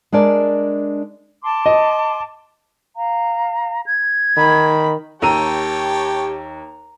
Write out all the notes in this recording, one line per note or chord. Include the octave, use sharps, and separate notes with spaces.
G#3 D4 A#4 D5
A5 C6 D6
D#5
F5 A#5
G#6
D#3 B5
D#2 G4 C#5 G5 A5 A#5 E6 D#7